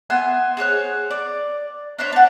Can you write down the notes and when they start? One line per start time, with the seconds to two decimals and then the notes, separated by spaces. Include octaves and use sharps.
0.10 B3 E5 G#5 C6
0.57 G#4 C5 C#5 F#6
1.11 D5
1.98 D4 C5 C#5 E5
2.12 D4 F#5